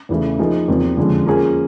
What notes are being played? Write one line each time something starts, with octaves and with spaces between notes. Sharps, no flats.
E2 C#3 E3 A3
F3 A#3 D#4 G#4
E2 C3 F3 A#3
F2 D3 F3 G#3 C#4
F3 A#3 C#4 F4 G#4